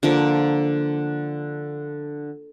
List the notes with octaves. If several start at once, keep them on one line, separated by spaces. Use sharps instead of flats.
D3 F3 A#3